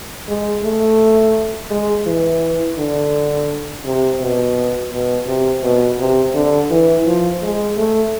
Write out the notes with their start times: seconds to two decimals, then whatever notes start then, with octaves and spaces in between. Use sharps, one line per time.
0.28 G#3
0.63 A3
1.70 G#3
2.06 E3
2.78 D3
3.85 C3
4.21 B2
4.92 B2
5.27 C3
5.63 B2
5.99 C3
6.35 D3
6.70 E3
7.06 F3
7.42 G#3
7.77 A3